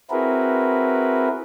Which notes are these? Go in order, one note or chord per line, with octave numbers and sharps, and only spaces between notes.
C4 E4 F#4 G#4 A#4 B4